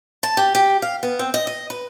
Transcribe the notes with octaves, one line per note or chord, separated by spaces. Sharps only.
A5
G4
G4
F5
B3
C4
D#5
D#5
B4